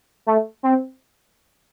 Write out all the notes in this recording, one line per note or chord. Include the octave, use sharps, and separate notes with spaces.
A3
C4